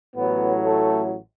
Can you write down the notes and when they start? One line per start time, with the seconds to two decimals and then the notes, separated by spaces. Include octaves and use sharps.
0.16 A1 A2 F#3 B3
0.66 A3